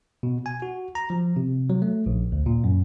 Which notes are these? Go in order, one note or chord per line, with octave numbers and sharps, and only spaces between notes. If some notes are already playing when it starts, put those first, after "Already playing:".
B2
G#5
F#4
A#5
F3
C3
F#3
A3
A#1
D2
A#2
F#2